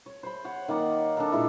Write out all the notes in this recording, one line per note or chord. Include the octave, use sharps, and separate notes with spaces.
C#5
C5 B5
C#5 F#5
D#3 A#3 D5 F#5
D4 A4 A#4
A#2 G#3 E4